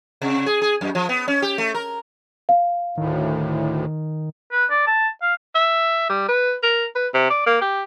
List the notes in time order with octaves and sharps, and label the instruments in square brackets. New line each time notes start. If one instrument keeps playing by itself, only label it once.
[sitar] C3
G#4
G#4
F#2
F3
B3
C#4
G4
A3
A#4
[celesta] F5
[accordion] D2 A2 [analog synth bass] D#3
[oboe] B4
D5
A5
F5
[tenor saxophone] E5
G3
B4
A#4
B4
C3
D5
A#3
G4